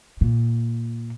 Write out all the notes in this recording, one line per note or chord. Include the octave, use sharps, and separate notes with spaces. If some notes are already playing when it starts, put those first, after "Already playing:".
A#2